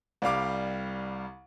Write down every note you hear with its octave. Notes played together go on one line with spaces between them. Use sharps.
C2 G3 F5 D6